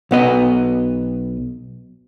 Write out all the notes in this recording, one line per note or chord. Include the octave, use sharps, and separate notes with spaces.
B1 B3 D#5